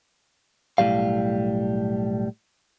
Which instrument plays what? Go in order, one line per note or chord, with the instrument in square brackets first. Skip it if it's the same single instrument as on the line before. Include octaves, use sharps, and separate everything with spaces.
[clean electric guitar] B1 A2 D#3 G3 F5